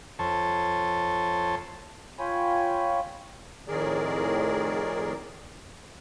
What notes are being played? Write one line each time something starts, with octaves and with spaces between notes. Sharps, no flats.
F2 A4 C5 C#5 A5
F4 C#5 G5 G#5 B5
F2 A2 D#3 G#4 A#4 D5